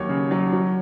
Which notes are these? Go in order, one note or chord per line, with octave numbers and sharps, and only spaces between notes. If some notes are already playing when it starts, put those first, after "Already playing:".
Already playing: D#2 F#3 C#5
C#3
F#3
F#3